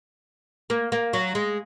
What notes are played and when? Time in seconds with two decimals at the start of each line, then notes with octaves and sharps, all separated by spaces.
0.70 A#3
0.92 A#3
1.13 F#3
1.35 G#3